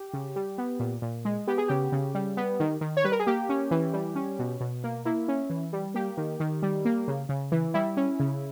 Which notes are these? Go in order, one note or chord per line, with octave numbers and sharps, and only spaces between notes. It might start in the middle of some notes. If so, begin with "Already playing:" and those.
Already playing: G4
C#3
G3
B3
A#2
A#2
G#3
B3 G4
G#4
C#3 G4
C#3
G3
B3
D#3
D#3
C#5
G3 B4
A#4
G#4
A#3 G4
C#4
E3
G3
C#4
B2
B2
A#3
A#3 E4
C#4
E3
G3
A#3 G4
D#3
D#3
G3
A#3
C#3
C#3
E3
G3 E4
C#4
C#3